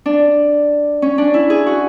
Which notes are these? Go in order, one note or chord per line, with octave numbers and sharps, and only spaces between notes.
D4
C#4
D4
E4
G#4
F#4